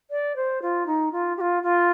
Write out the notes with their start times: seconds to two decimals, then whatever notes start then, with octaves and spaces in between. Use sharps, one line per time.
0.10 D5
0.36 C5
0.62 F4
0.86 D#4
1.12 F4
1.37 G4
1.41 F4
1.63 F4